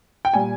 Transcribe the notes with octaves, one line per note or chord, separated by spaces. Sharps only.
G5
A#2 G3 G#5